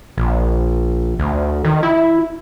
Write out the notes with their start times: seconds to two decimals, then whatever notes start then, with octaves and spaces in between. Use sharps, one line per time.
0.18 A#1
1.19 D2
1.65 D#3
1.83 E4